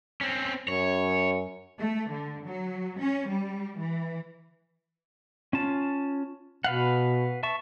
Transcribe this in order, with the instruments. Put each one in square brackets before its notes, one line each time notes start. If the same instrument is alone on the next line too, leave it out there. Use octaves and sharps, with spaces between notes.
[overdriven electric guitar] C4 C#4
[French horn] F#2 [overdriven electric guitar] C#5
[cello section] A3
D3
F#3
C#4
G3
E3
[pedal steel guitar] C#4 F4 A5
[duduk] B2 [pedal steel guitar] B4 F5 F#5
[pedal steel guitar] E5 A5 C#6